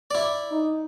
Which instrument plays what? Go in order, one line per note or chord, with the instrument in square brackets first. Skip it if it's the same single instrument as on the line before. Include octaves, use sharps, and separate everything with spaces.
[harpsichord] E4 D5
[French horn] D#4